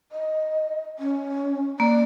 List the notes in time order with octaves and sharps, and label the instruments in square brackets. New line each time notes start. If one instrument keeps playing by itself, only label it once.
[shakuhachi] D#5
C#4
[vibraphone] A#3 [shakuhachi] D5